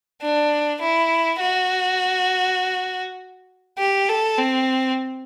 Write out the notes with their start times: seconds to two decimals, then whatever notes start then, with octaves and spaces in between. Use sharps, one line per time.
0.22 D4
0.81 E4
1.41 F#4
3.79 G4
4.09 A4
4.38 C4